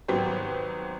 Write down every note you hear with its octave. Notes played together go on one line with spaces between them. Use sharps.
G#1 F#3 B3 F#4 G4 C5